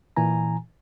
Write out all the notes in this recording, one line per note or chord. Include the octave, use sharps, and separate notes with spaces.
A#2 E3 G#5 A#5